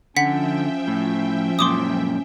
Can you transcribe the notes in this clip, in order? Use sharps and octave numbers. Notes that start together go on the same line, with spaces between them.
D3 F3 C#4 E5 F#5 G5 B6
A2
F#2 A#2 C6 D6 D#6